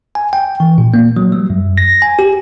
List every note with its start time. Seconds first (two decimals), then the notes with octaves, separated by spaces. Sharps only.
0.15 G#5
0.33 G5
0.60 E3
0.78 A#2
0.94 A#3
1.17 F#3
1.32 G3
1.50 F#2
1.78 A#6
2.02 G#5
2.19 G4